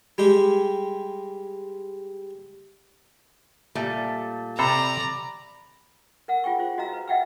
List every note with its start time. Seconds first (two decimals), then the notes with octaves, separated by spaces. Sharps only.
0.18 G3 G#3 G4
3.75 A#2 G3 A3
4.59 C3 A4 C5 D5 A#5 B5
6.28 A#4 F#5 E6
6.44 F4 G#4 G5 C#6
6.59 F4 C5
6.78 F#4 D#5 F5 A#5 E6
6.93 B4
7.08 D#5 E5 F#5 G5 C#6 E6